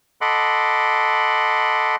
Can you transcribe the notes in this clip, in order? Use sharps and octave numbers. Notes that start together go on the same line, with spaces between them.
A4 D#5 F#5 B5 C6 D6